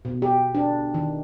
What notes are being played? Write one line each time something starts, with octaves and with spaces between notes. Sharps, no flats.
B2
G4
D4
D#3